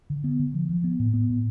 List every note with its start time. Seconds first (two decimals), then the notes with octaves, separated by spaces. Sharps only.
0.10 D3
0.24 B3
0.39 D3
0.54 F3
0.69 F3
0.84 B3
0.99 A2
1.14 B3
1.29 A2